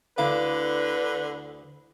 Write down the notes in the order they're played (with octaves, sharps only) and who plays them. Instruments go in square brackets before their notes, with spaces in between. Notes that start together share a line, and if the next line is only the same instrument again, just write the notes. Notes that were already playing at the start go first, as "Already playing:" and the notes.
[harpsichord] D2 D6 [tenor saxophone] D3 [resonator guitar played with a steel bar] E4 F5 [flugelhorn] B4